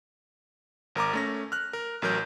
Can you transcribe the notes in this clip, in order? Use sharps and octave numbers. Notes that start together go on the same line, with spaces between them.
G#1 A#4 A#5 D6
A3 C#4 A#6
F6 F#6
A#4
A1 F#3 A#4 G6